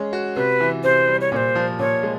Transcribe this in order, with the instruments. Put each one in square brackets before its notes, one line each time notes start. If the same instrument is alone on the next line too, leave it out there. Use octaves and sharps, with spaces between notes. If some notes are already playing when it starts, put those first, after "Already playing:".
Already playing: [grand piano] G#3 C#4
F#4
[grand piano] C3 [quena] B4
[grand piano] E3
[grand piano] C3 [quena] C5
[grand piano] G3
[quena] C#5
[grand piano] A#2 [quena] C#5
[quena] C5
[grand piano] F3
[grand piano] A#2 [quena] C#5
[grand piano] G#3